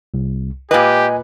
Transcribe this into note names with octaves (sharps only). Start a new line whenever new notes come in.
C2
A#2 G4 B4 D#5 G#5